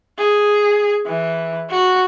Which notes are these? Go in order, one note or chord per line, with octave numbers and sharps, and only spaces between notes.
G#4
E3
F#4